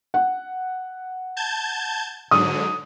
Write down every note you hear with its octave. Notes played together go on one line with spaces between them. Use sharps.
F#5
A5 G6 G#6
G#2 D3 F#3 D#6